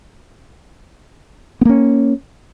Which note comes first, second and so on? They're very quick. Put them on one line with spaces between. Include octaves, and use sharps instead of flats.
B3 A#3 C#4